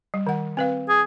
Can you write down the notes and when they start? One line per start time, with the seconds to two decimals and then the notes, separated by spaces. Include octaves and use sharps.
0.14 G3
0.27 D#3 F#5
0.57 C4 B4 F5
0.89 G#4